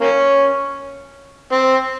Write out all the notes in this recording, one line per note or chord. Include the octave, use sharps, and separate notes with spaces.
A#3 C#4
C4